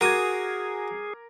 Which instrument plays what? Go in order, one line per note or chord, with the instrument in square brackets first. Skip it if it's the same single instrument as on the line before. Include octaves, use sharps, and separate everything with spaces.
[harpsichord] F#4 D#6 [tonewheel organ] G#4 [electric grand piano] A#4 D6 G#6